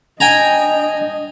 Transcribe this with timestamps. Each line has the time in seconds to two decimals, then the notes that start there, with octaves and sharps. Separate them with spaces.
0.20 D4 D#5 G5 G#5 A#5